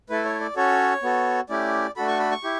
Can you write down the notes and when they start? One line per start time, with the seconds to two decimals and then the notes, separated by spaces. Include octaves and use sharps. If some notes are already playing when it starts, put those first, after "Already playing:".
0.09 A3 E4 A4 B4
0.25 C#5
0.40 D5
0.56 C#4 F#4 A4 C#5
1.03 B3 F#4 A4
1.49 A3 C#4 E4 G4 D5
1.96 A3 D4 F#4 A4 B5
2.08 C#6
2.20 B5
2.31 C#6
2.44 E4 G4